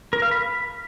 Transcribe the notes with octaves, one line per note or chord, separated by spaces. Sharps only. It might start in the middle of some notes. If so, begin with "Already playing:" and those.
A#4
F5
B5